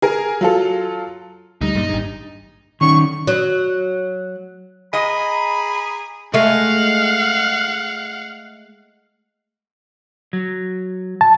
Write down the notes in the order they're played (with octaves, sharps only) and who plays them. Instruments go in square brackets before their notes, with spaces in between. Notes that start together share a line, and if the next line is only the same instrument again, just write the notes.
[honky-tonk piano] G#4 A#4
F#3 F4 A4
[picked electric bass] D2 G3 [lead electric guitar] D#4
[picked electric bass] F#2 A#2 G3
G#1 G2
[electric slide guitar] D#3 C#4 [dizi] C#6
[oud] F#3
[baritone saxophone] G#4 [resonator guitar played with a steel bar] D#5 [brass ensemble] A#5 [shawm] B5
[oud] G#3 A3 [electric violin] F5 F#5
[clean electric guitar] F#3
[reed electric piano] A5